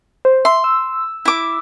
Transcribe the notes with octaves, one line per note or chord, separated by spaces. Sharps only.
C5
E5 C6
E6
E4 D6